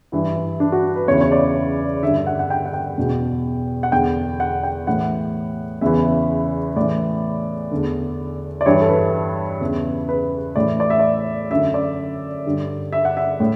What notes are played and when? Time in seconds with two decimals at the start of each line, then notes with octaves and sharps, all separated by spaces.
0.12 G2 E3 E4
0.36 E4
0.60 D4
0.72 F#4
0.96 B4
1.08 E2 C#3 E3 C#5
1.21 C#5
1.32 D5
2.02 G2 D3 E5
2.17 E5
2.27 F#5
2.39 F#5
2.50 G5
2.66 F#5
2.73 G5
2.97 E2 B2
3.83 F#5
3.92 E2 D3 G5
4.40 F#5
4.63 G5
4.87 A2 E3 F#5
5.81 E2 C#3 E3 E5
6.76 A2 E3 D5
7.71 E2 D3
8.61 D5
8.66 G2 E3 C#5
8.81 A4
8.89 B4
9.61 E2 C#3 E3
10.09 B4
10.56 A2 E3 D5
10.80 D5
10.90 E5
10.99 D5
11.50 F#2 D3 E5
11.74 D5
12.46 G2 D3
12.92 E5
13.05 F#5
13.17 E5
13.40 A2